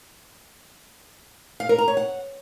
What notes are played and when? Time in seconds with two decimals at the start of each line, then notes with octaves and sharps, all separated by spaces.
1.60 F5
1.69 A#4
1.78 A#5
1.88 C#5
1.97 F#5